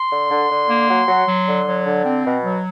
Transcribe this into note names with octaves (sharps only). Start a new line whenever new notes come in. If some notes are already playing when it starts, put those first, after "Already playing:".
Already playing: C6
D3
D3
D3
A#3
F#3
F#3
F#3
D3
F#3
D3
C4
B2
F#3